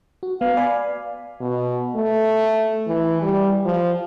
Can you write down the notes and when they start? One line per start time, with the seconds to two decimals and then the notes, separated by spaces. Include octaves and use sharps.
0.23 F#4
0.41 B3 F5
0.57 D5 G#5 B5
1.40 B2
1.96 A3
2.88 E3
3.22 G3
3.65 F3